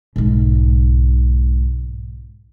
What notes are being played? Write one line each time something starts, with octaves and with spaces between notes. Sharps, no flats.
B1 G#2